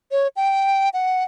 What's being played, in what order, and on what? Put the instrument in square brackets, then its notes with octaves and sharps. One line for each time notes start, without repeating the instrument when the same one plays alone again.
[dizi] C#5
G5
F#5